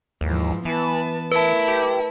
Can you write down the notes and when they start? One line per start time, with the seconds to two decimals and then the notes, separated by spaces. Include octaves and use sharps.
0.21 D#2 G#2 E3 F3
0.65 E3 B3 B4 A5
1.32 A3 E4 A#4 B4 A5
1.68 G4